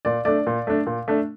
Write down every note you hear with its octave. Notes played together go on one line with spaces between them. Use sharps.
A#2 D5
A3 D4 D5
A#2
A3 D4
A#2
A3 D4